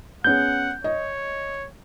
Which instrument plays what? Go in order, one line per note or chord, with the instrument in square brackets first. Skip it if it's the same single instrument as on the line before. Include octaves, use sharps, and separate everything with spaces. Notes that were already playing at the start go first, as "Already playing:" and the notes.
[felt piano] B3 C#4 G#4 [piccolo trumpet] F#5 [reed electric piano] G6
[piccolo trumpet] C#5 [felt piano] D#5